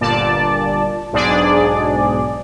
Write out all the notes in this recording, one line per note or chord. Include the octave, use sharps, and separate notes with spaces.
G1 A#2 D5 A5
B1 G#2 D4 G#4 D5